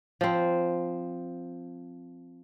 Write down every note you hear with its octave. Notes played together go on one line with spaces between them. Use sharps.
F3 C4